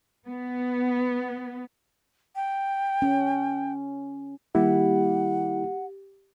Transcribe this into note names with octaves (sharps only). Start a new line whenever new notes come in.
B3
G5
C#4
D#3 G3 A#3 E4 G4 F#5